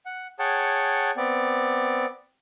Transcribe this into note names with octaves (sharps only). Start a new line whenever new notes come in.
F#5
G#4 C#5 F#5 G5 A5
B3 C4 D5